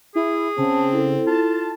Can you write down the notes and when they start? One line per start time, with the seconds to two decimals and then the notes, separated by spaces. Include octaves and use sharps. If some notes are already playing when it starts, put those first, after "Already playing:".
0.15 E4 G#4
0.58 C#3 C4 A5
0.93 E4 A4
1.27 F4 A5